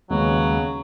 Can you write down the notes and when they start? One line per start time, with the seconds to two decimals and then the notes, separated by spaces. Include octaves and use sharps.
0.10 D#2 C#3 F#3 G#3 B3